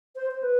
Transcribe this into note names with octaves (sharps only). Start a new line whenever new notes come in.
C5
C5
B4